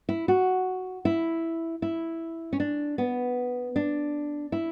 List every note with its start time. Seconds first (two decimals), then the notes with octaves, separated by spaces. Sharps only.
0.09 E4
0.28 F#4
1.05 E4
1.82 E4
2.53 C#4
2.60 D4
2.98 B3
3.76 D4
4.52 E4